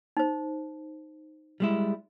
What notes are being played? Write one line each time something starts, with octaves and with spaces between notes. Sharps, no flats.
D#4 C5
G3 G#3 E4